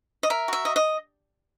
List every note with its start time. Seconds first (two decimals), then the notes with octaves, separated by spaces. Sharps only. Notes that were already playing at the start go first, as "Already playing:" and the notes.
0.23 D#5
0.30 A#4 E5
0.48 F#4 E5
0.65 D#5
0.76 D#5